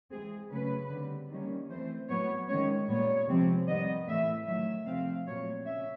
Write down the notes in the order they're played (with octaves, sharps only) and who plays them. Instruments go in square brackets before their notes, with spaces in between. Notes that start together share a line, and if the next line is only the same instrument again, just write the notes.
[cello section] E3 G#3 C4 G#4
C#3 F#3 A3 C#4 B4
D3 G3 C4
D#3 G3 A#3 C#4
E3 A3 C4 C5
A2 F#3 B3 C#5
D#3 G#3 C#4 C#5
A#2 G3 B3 C#5
C3 F3 G#3 C4
D#3 G3 B3 D#5
A2 E3 A3 E5
D#3 F#3 A3 E5
C3 F3 A3 C4 F5
A#2 F#3 A3 C4 C#5
C#4 E5